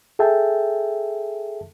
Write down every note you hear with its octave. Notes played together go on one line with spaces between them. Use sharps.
G#4 A4 E5 G5 A5